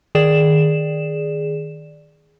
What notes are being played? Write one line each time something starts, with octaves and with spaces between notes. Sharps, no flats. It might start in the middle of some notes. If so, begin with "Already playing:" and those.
D#3 G#4 D5 E7